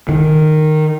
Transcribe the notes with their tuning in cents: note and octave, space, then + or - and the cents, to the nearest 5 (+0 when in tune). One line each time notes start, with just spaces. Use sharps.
D#3 -10